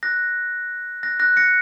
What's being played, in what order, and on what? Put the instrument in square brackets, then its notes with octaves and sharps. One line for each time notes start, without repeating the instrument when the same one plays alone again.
[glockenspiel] F#6 A#6
F#6 A#6
F#6 A#6
A#6 C#7